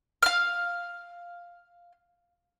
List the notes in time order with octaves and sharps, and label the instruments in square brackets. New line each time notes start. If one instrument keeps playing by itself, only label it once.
[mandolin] F5 F6